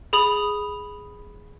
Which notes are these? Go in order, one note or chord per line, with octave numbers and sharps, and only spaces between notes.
G#4 B5 D#6